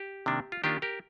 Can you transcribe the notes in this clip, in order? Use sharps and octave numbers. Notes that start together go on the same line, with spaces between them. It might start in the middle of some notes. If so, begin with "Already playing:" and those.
Already playing: G4
C3 D#3 A#3 D4
F4
D#3 A#3 D4 F4 G4
G4 A#4